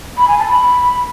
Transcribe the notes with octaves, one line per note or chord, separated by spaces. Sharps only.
B5
G#5
A5
B5